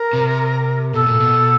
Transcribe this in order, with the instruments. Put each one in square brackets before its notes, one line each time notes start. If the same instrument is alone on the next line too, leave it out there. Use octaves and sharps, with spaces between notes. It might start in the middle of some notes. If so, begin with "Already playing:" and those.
Already playing: [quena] A#4
[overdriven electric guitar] C3
[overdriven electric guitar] B2 [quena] A4
[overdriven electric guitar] A#2
B2